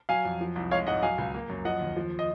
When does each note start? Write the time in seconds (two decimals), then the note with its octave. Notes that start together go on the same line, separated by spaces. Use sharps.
0.09 F#3 F5 G#5
0.25 F2
0.41 F3
0.56 C2
0.71 G#3 C#5 F5
0.87 G#2 D#5 F#5
1.02 F#3 F5 G#5
1.18 C#2
1.34 A#3
1.50 F#2
1.65 F3 D#5 F#5
1.81 D#2
1.97 F3
2.19 D#5